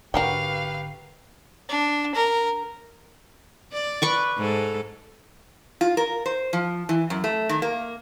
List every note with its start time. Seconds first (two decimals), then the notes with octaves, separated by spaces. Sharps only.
0.14 G#1 D3 F#4 G4 A#4 B4 F5 G5
1.69 D4
2.14 A#4
3.73 D5
4.02 B4 C#6 D6
4.37 G#2 A4
5.81 F4
5.97 A#4
6.26 C5
6.53 F3
6.89 E3
7.10 F#2
7.24 A3
7.49 D#3
7.62 A#3